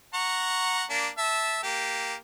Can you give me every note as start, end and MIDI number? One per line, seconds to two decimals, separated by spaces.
0.14 0.83 78
0.14 0.83 82
0.14 0.83 85
0.90 1.08 58
0.90 1.08 62
1.18 1.59 76
1.18 1.59 81
1.63 2.14 58
1.63 2.14 67